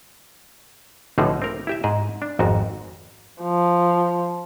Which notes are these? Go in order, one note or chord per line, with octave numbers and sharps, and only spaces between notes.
B1 A2 D3 F3 D#4 G#4
C4 A#4
E4 G4 E5
G#2 G#4 D#5
D4
G#1 F2 G#2 F#4
F3